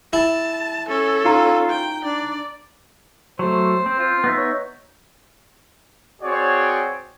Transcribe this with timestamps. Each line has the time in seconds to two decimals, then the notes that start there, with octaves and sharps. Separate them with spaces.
0.13 E4 A5
0.88 C#4 A4
1.25 D#4 F4 A#5
1.69 G5
2.05 D4 D5
3.39 F#3 A3 C5
3.86 C4
3.99 F4
4.24 B3 D#4 E5
4.37 C#5
6.22 C4 F#4 G#4 C#5 D5